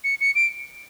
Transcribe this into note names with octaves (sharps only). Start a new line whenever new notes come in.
C#7
C#7
D7